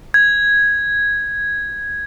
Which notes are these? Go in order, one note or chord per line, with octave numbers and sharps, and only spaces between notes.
G#6